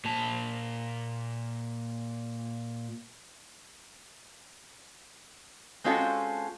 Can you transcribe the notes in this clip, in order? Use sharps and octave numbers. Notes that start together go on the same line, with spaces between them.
A#2 A5
G#3 C4 C#4 F4 F#4 A4